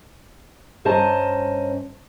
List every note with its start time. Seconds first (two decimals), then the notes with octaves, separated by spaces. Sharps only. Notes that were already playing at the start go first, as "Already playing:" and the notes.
0.85 G2 C#4 C5 D#5 A5 A#5